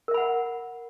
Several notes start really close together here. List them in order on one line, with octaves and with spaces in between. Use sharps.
A#4 E5 B5 F#5